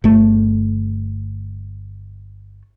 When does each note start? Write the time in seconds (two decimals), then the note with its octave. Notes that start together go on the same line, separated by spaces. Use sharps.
0.04 G1 A3